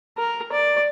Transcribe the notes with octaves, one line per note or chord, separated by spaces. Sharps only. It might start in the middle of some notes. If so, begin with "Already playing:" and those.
A#4
D5